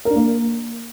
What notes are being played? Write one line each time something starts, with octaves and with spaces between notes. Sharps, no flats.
A#4
D4
A#3